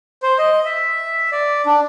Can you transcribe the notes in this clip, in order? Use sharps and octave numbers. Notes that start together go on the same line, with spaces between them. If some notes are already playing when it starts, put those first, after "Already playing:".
C5
D#5
E5
D5
D4